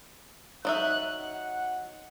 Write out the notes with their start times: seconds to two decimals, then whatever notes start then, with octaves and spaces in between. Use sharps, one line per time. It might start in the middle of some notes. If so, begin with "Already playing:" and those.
0.65 F#3 D#4 E5 F#6
1.22 F#5